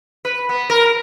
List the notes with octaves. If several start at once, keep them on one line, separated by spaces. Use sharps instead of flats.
B4
B3
A#4